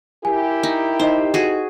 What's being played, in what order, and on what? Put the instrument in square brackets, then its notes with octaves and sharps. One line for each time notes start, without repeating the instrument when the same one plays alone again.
[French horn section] E4 G4 A#4 [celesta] G#5
[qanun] D#4
[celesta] D#4 D#5 [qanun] C5
[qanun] F#4 G#4